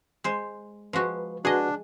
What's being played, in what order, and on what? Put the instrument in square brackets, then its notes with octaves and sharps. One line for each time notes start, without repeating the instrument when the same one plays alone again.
[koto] G#3 C5
[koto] F3 G#3 F#4 [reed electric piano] B4
[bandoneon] D4 [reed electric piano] F#4 B4 F#5 [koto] G#4 D#5